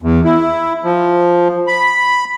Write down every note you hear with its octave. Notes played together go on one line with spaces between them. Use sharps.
E2
E4
F3
B5